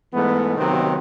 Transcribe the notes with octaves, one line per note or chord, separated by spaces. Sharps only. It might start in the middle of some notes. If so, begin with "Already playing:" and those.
G#2 E3 G#3 A3 B3
D#2 C3 D#3 F#3 B3 C4